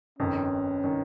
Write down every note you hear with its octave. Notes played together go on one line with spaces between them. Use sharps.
G1 F2 D#3 C#4
D#3